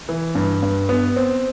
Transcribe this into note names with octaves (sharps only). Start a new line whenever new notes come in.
E3
G2
G2
B3
C4